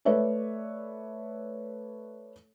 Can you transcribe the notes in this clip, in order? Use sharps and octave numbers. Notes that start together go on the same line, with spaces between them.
A3 A4 B4 C#5 D5 E5